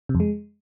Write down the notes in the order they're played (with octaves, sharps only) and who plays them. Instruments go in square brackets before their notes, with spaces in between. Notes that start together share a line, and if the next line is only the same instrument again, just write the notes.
[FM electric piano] C3
F2
G#3